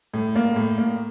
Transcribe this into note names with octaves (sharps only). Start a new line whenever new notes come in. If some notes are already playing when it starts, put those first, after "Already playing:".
A2
A#3
A2
A#3